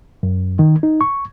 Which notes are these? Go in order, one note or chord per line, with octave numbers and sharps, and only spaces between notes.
F#2
D#3
D#4
C#6